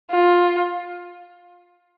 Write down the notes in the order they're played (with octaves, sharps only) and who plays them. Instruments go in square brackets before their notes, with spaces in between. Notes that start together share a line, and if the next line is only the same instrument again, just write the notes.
[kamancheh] F4